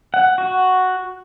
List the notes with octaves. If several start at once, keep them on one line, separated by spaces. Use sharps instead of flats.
F#5
F#4